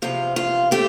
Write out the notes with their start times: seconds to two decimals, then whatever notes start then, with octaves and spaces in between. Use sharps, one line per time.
0.02 E2 C3 F3 F4
0.36 F4
0.71 A3 C4 G4